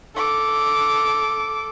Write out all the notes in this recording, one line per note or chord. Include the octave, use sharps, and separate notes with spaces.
A4 D6